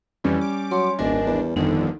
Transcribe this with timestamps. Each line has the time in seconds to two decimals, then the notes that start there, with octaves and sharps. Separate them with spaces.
0.24 F2 E3 G3 C#4
0.41 D6
0.71 F#3 C#5 C6
0.99 D#1 G#1 D4 A#4 D#5 G#5
1.26 E2
1.56 G1 F2 D3 D#3 D#4